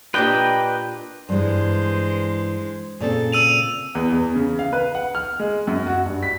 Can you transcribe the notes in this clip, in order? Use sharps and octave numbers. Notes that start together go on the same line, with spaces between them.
A#2 D4 G4 B4 D#5 G5
G2 E3 G#3 C5
A#2 C#3 C4 A4
E6 D#7 F7
E2
E2
C#3
F5
B4
F#5
F6
G#3
F#2
F#4
G2
B6